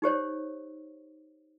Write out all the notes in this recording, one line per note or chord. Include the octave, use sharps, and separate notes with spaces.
D#4 G4 C5 C#5